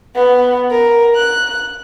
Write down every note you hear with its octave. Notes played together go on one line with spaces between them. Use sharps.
B3
A#4
F#6